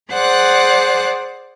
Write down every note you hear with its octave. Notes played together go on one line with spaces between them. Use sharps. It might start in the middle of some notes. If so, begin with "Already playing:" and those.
G#4 C5 D5 F#5 F#6